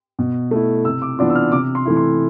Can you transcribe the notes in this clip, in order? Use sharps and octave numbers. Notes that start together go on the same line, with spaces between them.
B2
A3 E4
C3 E6
D6
E3 B3 D4 F4 D6
E6
F6
C3 D6
C6
E3 A3 E4
C6